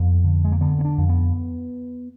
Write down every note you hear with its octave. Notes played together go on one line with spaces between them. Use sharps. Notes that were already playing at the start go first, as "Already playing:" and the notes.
Already playing: F2 B3
D3
G#3
A#3
D3 B3
B3
D4
F2
B3